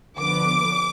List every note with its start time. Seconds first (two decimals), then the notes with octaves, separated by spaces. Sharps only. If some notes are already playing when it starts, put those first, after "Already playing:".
0.18 D3 F3 B3 D6